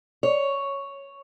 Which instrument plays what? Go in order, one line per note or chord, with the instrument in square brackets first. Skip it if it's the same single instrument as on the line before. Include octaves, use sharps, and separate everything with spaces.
[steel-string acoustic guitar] C#5